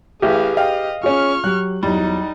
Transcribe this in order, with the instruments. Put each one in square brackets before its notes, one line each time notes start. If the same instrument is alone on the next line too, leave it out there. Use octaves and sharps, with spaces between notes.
[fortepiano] A1 [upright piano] G4 B4 [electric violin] G#4 F5
[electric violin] D#5 [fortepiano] F5 [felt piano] G5
[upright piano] C#4 G#4 [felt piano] F4 [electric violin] C#6 F6
[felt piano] F#3 G4 [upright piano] F#6
[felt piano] E2 F#3 [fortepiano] G3 [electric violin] D#4